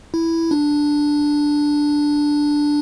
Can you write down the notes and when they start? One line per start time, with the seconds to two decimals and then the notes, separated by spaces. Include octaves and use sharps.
0.14 E4
0.51 D4